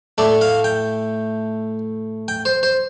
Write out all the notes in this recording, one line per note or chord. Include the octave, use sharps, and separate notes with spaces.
A2 A3 D5
F5
G5
G5
C5
C5